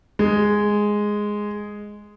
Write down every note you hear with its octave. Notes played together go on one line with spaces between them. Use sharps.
G#3